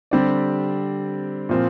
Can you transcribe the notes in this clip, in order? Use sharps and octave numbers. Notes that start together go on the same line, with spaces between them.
D3 G3 C4 G4 D5
A#2 F3 C4